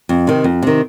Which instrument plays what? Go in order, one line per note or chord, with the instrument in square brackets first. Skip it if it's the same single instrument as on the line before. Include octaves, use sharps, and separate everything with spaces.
[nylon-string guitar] F2
C3 D#3
F2
C3 D#3